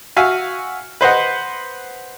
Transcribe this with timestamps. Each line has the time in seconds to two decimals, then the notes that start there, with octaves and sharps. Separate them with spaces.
0.16 F#4 E5 F5 G#5
1.01 B4 C5 D#5 F#5